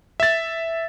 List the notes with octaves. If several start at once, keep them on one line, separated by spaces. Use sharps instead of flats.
E5 A6